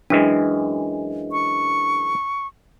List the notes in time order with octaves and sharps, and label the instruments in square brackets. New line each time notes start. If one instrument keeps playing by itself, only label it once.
[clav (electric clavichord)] F#2 E3 G#3 [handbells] D4
[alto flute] C#6